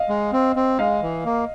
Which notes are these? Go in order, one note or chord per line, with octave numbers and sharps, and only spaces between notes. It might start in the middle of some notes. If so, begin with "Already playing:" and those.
Already playing: D#5 F5
G#3
C4
C4
G#3 D#5 F5
E3
A#3